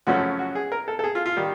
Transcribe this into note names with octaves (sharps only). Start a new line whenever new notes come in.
F#2 C#3 F3 A3 C#4 F#4
F#4
G#4
A#4
A4
A4
G#4
F4
F4
D#3 G3